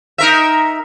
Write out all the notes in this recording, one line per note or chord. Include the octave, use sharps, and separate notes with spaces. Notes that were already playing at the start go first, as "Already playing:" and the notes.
D#4 A#4 E5